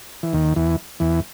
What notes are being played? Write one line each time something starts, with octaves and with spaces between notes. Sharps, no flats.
E3
D#2 D#3
E2 E3
E2 E3